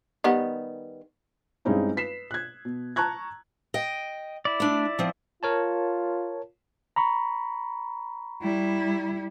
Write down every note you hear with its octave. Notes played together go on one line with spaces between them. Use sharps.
D#3 G3 B3
G2 G#3 C4 C#4 D#4 E4
B4 B6 C7 E7
F#6 G#6
B2
A5 A#5 C#6 F#6 G#6
D#5 G5
E4 D5
A3 D4
F3 C4
F4 A#4 C#5 A5
A#5 B5 C#6
G3 E4